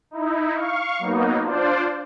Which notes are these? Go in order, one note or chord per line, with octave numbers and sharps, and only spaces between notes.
D#4 E4
F5 C#6
F#3 A#3 B3 D#4
D4 F4 C5 D5